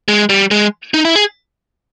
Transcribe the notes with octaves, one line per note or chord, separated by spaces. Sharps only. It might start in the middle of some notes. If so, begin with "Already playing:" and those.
G#3
G3
G#3
D#4
E4
G#4